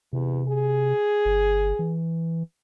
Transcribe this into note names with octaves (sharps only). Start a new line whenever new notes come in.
E2 C3
G#4
G1
E3